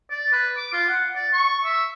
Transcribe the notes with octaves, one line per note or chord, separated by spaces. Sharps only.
D5
B4
D6
F4
F#5
D5
C#6
E5